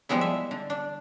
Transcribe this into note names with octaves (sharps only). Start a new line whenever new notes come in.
F3 G3 G#3 B3 E4
E5
D3
D4